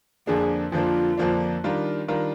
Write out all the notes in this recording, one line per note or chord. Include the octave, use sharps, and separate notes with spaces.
F2 D3 F3 A#3 D4 G#4
F2 D3 F3 A#3 D4 F4
F2 D3 F3 A#3 D4
D#3 G3 D4 F4 A#4
D#3 G3 D4 F4 A#4